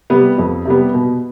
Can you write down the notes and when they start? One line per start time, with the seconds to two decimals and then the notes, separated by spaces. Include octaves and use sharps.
0.10 C3 G3 B3
0.38 F2
0.65 C3 G3 B3
0.94 B2